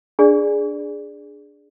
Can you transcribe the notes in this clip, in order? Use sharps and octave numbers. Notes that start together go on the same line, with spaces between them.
D4 G#4 D5